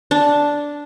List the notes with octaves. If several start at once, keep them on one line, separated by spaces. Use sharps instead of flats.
D4